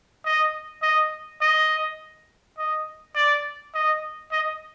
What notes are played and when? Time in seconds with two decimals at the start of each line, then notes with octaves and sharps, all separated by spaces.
0.25 D#5
0.82 D#5
1.41 D#5
2.58 D#5
3.15 D5
3.74 D#5
4.32 D#5